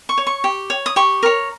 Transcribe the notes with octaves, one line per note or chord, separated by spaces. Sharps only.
C#6
C#5
C#6
G4
C#5
D#6
G4 C#6
A#4 C#5